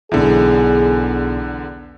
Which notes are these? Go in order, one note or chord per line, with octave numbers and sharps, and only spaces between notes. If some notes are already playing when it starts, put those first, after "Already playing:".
B1 E2 D3 E4 G#4